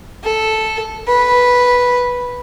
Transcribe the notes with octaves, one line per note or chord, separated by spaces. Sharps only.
A4
B4